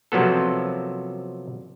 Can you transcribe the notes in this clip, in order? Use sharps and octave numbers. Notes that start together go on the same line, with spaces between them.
C3 F3 F#3 A#3 B3 A4